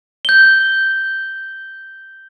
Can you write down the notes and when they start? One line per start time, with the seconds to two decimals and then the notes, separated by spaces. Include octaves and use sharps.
0.25 G6 G7